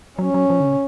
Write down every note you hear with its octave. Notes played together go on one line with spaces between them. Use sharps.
F#3 C#4
F#3
F3
D3
C#3